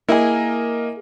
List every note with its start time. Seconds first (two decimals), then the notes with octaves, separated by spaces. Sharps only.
0.09 A#3 E4 G#4 A#4 D#5